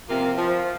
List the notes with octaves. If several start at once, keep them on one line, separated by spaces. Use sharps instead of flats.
C3 F3 A#3 F4
F3